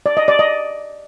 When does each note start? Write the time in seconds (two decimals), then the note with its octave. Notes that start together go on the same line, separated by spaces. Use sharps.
0.06 D5
0.17 D#5
0.28 D5
0.39 D#5